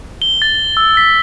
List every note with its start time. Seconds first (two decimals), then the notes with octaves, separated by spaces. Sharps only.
0.22 G7
0.42 A6
0.77 E6
0.97 B6